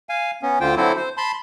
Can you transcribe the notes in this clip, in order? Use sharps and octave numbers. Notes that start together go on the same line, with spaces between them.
F5 G#5
B3 C#4
D2 D3 F4 C5 G5
D3 F#3 C4 E4 A4 C5
C5
A5 B5 C6